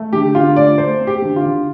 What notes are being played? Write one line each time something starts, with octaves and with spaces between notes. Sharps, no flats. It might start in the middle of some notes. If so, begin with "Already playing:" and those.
Already playing: A3
D3 G4
D3 F4
A3 D5
A3 C5
C4
G4
D3
F4
D3